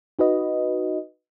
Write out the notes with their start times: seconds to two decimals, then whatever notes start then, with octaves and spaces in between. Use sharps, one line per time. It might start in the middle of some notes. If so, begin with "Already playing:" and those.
0.19 D#4 F#4 B4 D#5